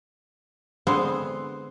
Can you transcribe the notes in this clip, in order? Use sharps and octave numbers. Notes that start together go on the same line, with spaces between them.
D3 G#3 B3 C4 G#4 C5